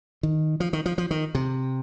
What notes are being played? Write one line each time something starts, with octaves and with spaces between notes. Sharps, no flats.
D#3
F3
D#3
F3
F3
D#3
C3